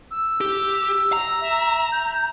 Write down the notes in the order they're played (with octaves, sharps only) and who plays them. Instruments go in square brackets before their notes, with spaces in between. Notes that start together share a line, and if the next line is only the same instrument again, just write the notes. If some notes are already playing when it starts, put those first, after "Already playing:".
[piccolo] E6
[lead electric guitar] G4
A#5
[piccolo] E5
G6